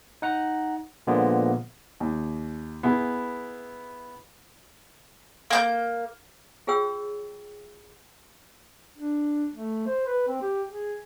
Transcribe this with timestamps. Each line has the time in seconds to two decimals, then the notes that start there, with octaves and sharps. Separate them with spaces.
0.22 D#4 F#5 A#5
1.07 A#2 D3 F3 G#3 A#3 B3
2.00 D#2
2.83 B3 E4 G#4
5.50 A#3 A#5 G6
6.67 F4 G#4 C#5 G5 E6
8.97 D4
9.56 A3
9.87 C5
10.07 B4
10.28 C4
10.42 G4
10.71 G#4